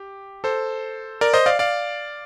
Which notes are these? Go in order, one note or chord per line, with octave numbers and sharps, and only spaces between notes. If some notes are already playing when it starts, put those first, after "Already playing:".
Already playing: G4
A4 C5
A#4 D5
C5 D#5
D5 F5
D5 F5